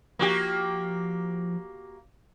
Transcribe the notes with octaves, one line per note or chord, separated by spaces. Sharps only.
F3 A#3 F#4 G4